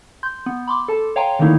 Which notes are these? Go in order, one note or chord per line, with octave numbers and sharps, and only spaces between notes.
C6 G6
B3
B5 C6 D6
A4 A5
C#5 F5 G5 G#5 A#5 C6
D3 D#3 A3 A#3 D#4 E4